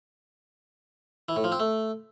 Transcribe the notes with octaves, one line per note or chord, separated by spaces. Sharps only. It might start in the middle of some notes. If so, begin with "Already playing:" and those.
E3
A2
F3
C4
A3